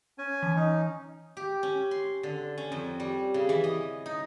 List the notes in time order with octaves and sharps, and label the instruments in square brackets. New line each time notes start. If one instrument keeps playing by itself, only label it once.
[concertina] C#4 G#5
[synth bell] E3
[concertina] C#4 D#4
[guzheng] G4
C#4
C6
D3
C#4
F2
G3
C#3
E3
D#5
D#4